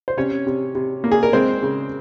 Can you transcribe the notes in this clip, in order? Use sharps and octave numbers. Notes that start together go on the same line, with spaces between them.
C5
C3 C#4 C#5
C3
C3
A#3
G#4
A#4
G#3 C4 C5
C#3